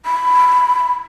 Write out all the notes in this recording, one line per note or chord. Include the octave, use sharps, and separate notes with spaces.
B5